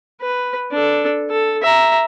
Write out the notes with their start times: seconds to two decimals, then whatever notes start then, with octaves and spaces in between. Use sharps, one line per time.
0.21 B4
0.72 D4 A4
1.30 A4
1.62 E5 A#5